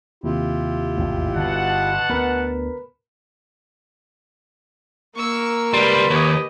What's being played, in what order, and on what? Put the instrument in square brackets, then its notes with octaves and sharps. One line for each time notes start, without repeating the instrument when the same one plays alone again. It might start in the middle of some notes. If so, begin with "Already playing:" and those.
[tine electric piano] D#2 C3 [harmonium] E4 F4 G4
[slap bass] A1 E2 G#2
[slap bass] G1 [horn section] B2 F#5 A5
[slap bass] D2 B3 [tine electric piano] A#4 B4 B5
[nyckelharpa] A#3 A#4 [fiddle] C#6 E6
[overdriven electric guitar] C#2 G3 [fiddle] B4 [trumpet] C6
[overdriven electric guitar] D#2 [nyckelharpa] G4 D#5 [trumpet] C#5